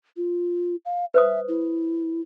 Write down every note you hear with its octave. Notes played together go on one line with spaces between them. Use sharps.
F4
F5
B4 C5 E5 D#6
E4